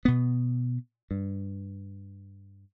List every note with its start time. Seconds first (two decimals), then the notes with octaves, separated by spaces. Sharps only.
0.05 B2 B3
1.11 G2